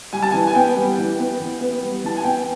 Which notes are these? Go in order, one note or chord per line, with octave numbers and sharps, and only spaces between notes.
G3 G#5
A5
E3 G#5
G#5
B3 G5
G3
E3
B3
E3
B3
G3
E3 A5
G#5
B3 G5